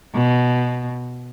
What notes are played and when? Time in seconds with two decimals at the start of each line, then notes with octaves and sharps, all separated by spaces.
0.15 B2